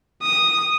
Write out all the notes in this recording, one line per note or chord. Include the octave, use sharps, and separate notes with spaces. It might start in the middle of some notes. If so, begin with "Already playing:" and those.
D#6